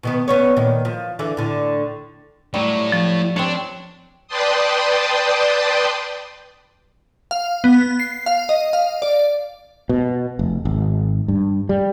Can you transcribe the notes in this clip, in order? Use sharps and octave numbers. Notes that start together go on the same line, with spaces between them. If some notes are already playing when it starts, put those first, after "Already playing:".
B2 D#3 B3
B3 C#4 C#5
A#2 D#3
F3
D3 E3
A2 D3
A2 F#3 G3
F3
C4 D4 C#5
B4 D5 G5 A5 C6 D#6
F5
B3
C7
F5
D#5
F5
D5
B2
F1
G#1
G2
G3